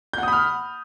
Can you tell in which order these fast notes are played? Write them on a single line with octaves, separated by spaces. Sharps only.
G6 F#5 D#6 B5 F6